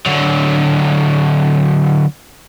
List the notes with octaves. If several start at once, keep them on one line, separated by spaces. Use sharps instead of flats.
D3 F#3